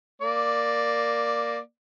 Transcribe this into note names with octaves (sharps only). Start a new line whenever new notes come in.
A#3 D5